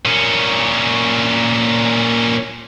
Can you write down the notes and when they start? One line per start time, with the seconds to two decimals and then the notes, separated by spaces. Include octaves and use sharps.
0.05 A#2 C#4